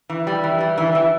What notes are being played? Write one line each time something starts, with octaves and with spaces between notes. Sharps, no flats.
E3
G3
E3
G3
E3
E3